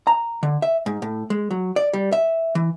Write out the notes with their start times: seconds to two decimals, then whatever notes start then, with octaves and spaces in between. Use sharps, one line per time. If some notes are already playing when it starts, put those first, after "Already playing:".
0.07 A#5
0.43 D3
0.62 E5
0.86 G#2
1.02 A2
1.30 G#3
1.51 F#3
1.76 D5
1.93 G3
2.12 E5
2.55 E3